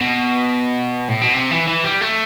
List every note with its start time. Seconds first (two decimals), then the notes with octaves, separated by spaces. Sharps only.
0.01 B2
1.08 A2
1.22 B2
1.34 C3
1.51 E3
1.68 E3
1.84 G3
2.01 A3